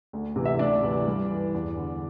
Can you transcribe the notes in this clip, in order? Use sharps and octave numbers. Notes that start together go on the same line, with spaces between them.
D2
C3 E3
E5
D2 D4 D5
C3 E3
G2
E3
E2
D3